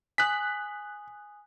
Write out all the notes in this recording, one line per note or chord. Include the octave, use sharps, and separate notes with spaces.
G#5 D#6 F#6 B6 F#7